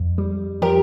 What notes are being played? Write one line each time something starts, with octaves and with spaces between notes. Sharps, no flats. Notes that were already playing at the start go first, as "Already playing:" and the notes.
Already playing: F2
G3
F3 G4 A#4